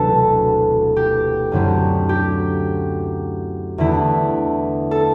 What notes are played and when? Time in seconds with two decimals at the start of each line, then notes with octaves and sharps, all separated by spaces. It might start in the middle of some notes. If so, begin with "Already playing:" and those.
Already playing: E1 D2 C3 F#3 A4 B4
0.96 G4
1.52 F#2 D3 F#3 C4 E4
2.09 G4
3.78 E2 D3 A3 E4
4.91 A4